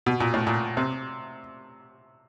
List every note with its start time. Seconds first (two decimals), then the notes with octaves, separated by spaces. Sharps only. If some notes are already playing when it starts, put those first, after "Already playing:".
0.06 B2
0.20 A#2
0.34 A2
0.47 A#2
0.77 C3